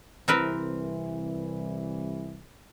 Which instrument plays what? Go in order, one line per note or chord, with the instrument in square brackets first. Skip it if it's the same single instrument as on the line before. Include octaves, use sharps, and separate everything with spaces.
[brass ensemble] C2 E3 [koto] C4 A#4 B4